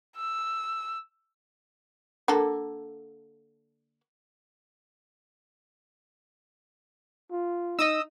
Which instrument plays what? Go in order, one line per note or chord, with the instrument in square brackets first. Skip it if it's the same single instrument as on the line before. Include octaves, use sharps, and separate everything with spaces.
[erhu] E6
[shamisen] D3 A#3 A4
[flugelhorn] F4
[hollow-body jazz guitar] D#4 [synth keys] D#5 D#6 E6